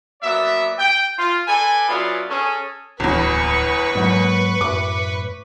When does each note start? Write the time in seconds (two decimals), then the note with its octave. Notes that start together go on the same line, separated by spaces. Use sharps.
0.22 F#3 A#3 B3 D5 E5
0.79 G5
1.19 F4
1.47 A4 B4 D5 G#5
1.89 F#3 B3 C#4 E4 F4 D5
2.29 C#4 G#4 A4
3.00 D1 G1 E2 B4 C#6
3.95 G#2 F#3 A#3
4.61 F#2 A2 D6